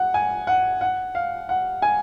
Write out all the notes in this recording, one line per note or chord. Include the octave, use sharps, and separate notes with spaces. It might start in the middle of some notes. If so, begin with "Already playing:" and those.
Already playing: F#5
G#5
F#5
F#5
F5
F#5
G#5